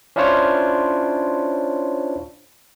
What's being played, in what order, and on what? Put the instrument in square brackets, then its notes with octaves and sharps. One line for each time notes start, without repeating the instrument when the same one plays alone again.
[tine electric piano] C#4 D4 E4 F4 C5 C#5